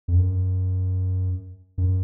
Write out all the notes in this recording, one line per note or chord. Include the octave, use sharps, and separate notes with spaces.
F2
F#2
F#2